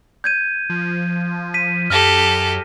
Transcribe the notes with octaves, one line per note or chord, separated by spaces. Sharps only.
G6 G#6 D#7
F3
B6 D#7
F#2 G4 A4 F6 A#6